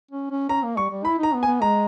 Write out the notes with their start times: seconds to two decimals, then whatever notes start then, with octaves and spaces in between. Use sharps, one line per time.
0.11 C#4
0.31 C#4
0.49 C#4 A#5
0.63 A#3
0.77 G3 C#6
0.91 G3
1.05 E4 B5
1.19 D#4 A#5
1.34 B3
1.43 G#5
1.47 B3
1.61 G#3 A#5